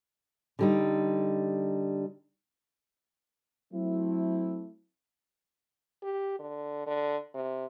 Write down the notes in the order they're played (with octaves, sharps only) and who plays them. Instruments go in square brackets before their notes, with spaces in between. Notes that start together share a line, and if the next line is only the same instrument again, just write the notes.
[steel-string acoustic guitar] D3 G3 D#4
[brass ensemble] F#3 A3 C4 E4
[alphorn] G4
D3
D3
C3